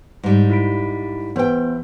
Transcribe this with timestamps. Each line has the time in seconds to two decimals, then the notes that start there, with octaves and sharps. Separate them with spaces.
0.23 G#2 G3
0.50 E4 B6 D7
1.36 E3 B3 C5 G5